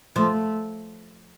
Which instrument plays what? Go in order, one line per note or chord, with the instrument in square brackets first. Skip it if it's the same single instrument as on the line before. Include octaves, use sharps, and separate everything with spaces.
[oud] F3 [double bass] A3